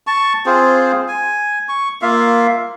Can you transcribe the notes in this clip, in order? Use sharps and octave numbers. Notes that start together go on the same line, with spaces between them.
A5 C#6
C4 F4 G#4 C5
G#5
C#6
A#3 F4 E5 F5